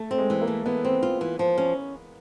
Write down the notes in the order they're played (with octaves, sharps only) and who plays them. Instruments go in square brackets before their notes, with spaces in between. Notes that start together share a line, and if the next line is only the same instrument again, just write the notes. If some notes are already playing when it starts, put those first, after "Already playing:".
Already playing: [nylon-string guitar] A3
C4
[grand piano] G#3
[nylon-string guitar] E3
[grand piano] A#3
[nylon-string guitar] A3
[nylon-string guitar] E3 [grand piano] B3
[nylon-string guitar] C4
F4
E3
F3
C#4